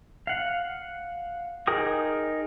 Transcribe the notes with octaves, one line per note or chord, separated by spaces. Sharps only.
F5 F#5
D#4 G#4 A#4 G5 D#6